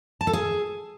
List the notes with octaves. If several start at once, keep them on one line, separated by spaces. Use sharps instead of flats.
A5
A4
G#4